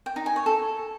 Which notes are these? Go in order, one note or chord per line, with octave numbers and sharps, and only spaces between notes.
G5
D#4
G#5
C#5
A4